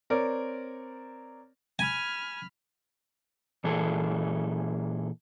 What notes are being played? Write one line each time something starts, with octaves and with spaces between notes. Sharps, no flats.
C4 A#4 C#5 D5
G#5 B5 F6
A#2 E3 G#4 A4